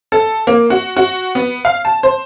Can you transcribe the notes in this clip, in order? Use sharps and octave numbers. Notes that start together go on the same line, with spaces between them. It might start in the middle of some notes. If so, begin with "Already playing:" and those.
A4
A#3
F#4
F#4
B3
F5
A5
C5